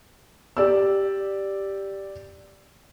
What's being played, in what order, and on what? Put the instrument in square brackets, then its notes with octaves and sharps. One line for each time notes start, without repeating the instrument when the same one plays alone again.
[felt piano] G4 D5 E6